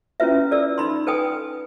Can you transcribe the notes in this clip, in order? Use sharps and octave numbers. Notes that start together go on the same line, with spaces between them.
C#4 E4 F4 B4 E5
A4 D5 E6
D#4 B5 C6
A4 B4 G5 G#5 D#6